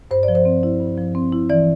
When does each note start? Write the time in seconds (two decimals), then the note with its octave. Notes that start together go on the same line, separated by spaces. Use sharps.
0.11 G2 C5
0.23 D5
0.28 F3
0.35 C5
0.45 C4
0.63 E4
0.80 G2
0.98 F3
1.15 C4
1.32 E4
1.50 E3 D5